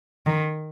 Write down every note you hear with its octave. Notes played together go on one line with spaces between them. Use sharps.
D#3